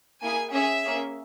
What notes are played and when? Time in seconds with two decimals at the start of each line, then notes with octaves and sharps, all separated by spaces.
0.22 A#3 E4 G#4 G#5
0.53 C#4 G#4 E5
0.83 A#3 C#4 G#4